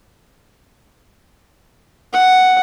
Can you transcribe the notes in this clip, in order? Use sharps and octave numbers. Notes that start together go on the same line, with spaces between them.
F#5